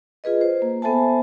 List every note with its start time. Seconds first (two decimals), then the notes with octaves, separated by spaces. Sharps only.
0.24 F4 G#4 B4 D#5
0.41 C5
0.62 A#3
0.82 B3 A4 C5 E5 G#5 A5